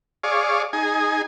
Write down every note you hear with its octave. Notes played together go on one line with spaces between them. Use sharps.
G#4 C#5 D5 F5
D#4 G#4 G#5